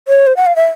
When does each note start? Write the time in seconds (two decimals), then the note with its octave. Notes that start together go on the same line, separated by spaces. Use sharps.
0.08 C#5
0.27 C5
0.37 F#5
0.46 F5
0.56 E5